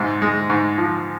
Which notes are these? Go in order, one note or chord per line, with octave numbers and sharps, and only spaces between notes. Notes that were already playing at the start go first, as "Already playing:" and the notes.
Already playing: G#2 C3
G#3
G#2
F3